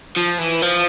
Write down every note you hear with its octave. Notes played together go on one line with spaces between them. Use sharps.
F3
E3
F3